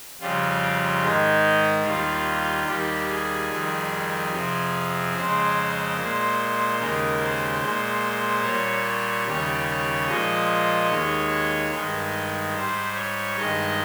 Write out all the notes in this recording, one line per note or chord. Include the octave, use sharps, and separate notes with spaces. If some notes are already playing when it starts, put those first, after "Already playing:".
F2 C#3 G3 F4
G#2 D#3 G#3 D#4
D#2 D#3 G3 F4
D#2 D#3 G3 G4
G#4
F2 D#3 G3
F2 C3 F3
F2 C#3 G#3 C5
A#2 G#3
D#2 C#3 G#3 A#4
C5
A#2 G#3
A#2 G3 C#5
C#5
D#2 C#3 G3 C#5
C#5
A#2 F3 G#3 D#5
D#2 D#3 G#3 C#5
G2 D#3 G#3
G#2 G3 C5
C#5
G2 D#3 G#3 D#5